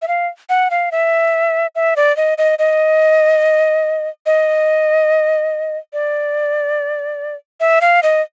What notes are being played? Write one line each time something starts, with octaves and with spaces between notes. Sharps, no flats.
E5
F5
F#5
F5
E5
E5
D5
D#5
D#5
D#5
D#5
D5
E5
F5
D#5